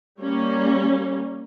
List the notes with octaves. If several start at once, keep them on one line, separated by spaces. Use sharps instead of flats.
G3 A#3 C#4